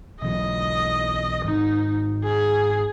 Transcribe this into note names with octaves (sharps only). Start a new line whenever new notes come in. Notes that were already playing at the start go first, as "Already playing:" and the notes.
B1 E3 F#3 D#5
G#1 D#4
G#4